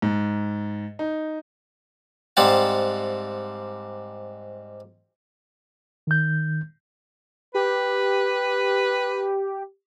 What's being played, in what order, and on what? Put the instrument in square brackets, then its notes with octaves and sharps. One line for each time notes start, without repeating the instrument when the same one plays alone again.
[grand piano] G#2
D#4
[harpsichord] G#2 G3 C4 F5 F#5 A5
[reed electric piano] D#3 G6
[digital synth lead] G4 [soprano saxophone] B4